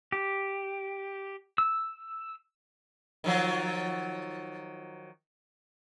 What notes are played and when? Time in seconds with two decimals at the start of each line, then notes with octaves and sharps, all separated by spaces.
0.12 G4
1.58 E6
3.24 D#3 F3 F#3